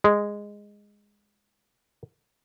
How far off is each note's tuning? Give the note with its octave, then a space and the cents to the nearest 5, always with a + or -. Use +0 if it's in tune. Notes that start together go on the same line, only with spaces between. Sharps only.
G#3 -10